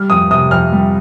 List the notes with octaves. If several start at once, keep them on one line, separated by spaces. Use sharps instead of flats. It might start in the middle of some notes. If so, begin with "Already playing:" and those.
Already playing: G3 F6
F2 D#6
C3 D#6
F2 F6
G3